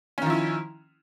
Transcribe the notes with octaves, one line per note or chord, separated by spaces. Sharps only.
D#3 F3 C#4 E4